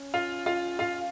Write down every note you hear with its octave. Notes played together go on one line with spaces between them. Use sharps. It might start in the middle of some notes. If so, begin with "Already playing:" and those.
Already playing: C#4
F4 F5
F4 F5
F4 F5